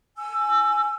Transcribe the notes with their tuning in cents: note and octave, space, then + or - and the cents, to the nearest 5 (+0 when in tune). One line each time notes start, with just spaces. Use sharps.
G#5 +10 E6 +20